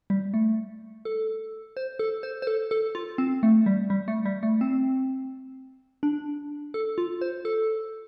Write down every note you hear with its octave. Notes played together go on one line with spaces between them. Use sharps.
G3
A3
A4
C5
A4
C5
C5
A4
A4
F4
C4
A3
G3
G3
A3
G3
A3
C4
D4
A4
F4
C5
A4